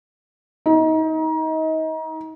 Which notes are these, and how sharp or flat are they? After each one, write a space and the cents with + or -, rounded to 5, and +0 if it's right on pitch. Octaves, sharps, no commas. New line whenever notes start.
D#4 +30